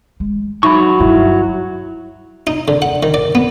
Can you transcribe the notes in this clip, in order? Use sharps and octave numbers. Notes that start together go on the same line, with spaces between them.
G#3
F#3 D#4 E5 B5 C#6
G1 G2 E4
D#4
D3
F#5
D#3
D5
B3